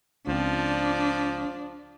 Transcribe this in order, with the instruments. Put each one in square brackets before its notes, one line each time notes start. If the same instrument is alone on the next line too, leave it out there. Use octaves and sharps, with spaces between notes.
[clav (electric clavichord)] C#2 C4 [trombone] F3 [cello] D4